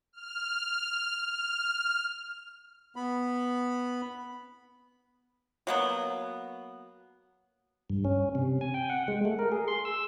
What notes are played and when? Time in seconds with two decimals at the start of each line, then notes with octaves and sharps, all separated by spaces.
0.13 F6
1.22 F6
2.96 B3 B5
5.67 F#3 A#3 B3
7.90 G2
8.05 C#4
8.35 C3
8.61 G#5
8.74 G5
8.90 F#5
9.08 G#3
9.25 A3
9.39 A#4
9.52 G#4
9.68 C6
9.85 E6